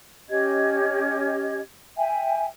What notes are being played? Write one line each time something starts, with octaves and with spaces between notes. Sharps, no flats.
C#4 G4 D#5 G#6
E5 G5 G#5